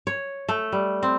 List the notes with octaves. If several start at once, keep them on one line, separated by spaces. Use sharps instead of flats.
C#5
A3
G3
C4